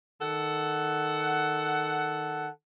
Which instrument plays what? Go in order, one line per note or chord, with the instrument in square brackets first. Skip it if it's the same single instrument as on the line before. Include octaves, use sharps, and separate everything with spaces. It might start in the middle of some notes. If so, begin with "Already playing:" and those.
[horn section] D#3 A4 F#5